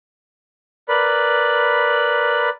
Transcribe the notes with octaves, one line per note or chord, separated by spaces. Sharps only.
A#4 B4 D5 B5